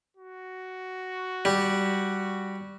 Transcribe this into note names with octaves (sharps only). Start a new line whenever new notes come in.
F#4
G3